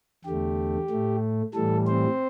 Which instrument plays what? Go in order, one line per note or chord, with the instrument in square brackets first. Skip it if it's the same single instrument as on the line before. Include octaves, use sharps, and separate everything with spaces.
[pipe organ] E2 D3 A3 G4
A2 A3
A2 E3 G3 A4
C4 C5